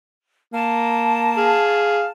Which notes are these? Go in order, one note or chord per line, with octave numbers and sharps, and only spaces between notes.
A#3 A5
G#4 F5